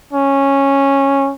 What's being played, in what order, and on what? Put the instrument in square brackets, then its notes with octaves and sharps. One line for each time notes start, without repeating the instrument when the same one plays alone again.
[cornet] C#4